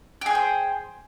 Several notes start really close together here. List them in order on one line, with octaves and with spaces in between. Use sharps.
G4 G#4 G5 C5